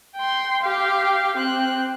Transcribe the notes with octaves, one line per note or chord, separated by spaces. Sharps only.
G5 C6
G4 F5
C4 F#6